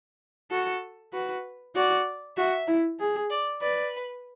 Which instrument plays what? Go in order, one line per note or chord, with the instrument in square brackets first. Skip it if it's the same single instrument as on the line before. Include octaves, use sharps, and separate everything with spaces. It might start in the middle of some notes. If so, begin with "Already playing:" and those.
[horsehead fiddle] F#4 [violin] A4
[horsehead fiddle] F#4 [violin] B4
[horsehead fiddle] F#4 [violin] D5
[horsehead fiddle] F#4 [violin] E5
[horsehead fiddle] E4
G#4
[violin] D5
[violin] B4 [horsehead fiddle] D5